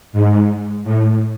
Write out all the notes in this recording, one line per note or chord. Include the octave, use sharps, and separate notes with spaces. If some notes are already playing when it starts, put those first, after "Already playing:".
G#2
A2